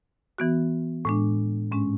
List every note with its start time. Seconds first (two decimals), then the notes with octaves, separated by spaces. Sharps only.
0.38 E3 B3 F#4
1.05 A2 G#3 D4
1.72 G#2 G#3 C#4